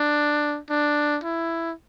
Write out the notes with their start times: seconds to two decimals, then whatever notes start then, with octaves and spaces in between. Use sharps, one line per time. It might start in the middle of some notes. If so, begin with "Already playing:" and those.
Already playing: D4
0.70 D4
1.24 E4